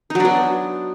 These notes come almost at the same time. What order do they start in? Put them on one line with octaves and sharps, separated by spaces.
D#4 F#3 D4 B3